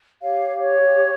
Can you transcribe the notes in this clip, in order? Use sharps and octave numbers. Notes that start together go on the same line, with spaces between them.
G4 C#5 F5
C#5